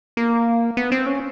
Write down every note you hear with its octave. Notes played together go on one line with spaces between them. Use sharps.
A#3
B3
C4
C#4